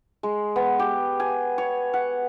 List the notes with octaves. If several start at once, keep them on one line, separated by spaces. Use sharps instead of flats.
G#3
B3
G4
G#5
C#5
F#5